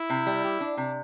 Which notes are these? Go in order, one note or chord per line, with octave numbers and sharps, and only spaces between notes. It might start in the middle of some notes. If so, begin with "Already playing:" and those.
Already playing: E4
C3
G3
G4
D4
C3